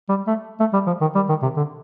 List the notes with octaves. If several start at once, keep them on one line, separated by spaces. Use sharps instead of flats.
G3
A3
A3
G3
F3
D#3
G3
D#3
C3
D3